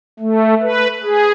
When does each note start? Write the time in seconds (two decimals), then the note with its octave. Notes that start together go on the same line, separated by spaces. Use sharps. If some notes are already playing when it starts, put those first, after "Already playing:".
0.20 A3
0.62 B4
1.03 G#4